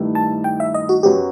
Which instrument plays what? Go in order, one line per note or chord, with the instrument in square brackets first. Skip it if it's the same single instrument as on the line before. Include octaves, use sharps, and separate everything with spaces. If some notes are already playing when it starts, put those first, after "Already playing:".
Already playing: [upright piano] G2 D#3 A3 E4
[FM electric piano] A5
G5
E5
D#5
F#4
[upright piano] F#2 F#3 B3 F#4 [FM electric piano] G4